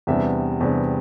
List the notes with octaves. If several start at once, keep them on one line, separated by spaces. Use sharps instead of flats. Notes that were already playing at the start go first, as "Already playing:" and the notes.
E2 C3 G3 B3 D4 E5
E2 C3 G3 B3 D4